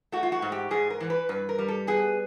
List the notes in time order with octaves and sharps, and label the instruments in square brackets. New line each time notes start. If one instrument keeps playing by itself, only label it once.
[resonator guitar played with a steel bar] A3 F#4
F4
F#4
G#2
G4
G#2 G#4
A#4
E3
B4
G2 B4
A#4
G3
A4
B3 G#4